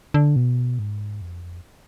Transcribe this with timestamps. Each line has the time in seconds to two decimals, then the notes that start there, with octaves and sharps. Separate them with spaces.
0.14 D3
0.36 B2
0.79 G#2
1.22 F2